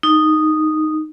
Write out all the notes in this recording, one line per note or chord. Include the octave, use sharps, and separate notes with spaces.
D#4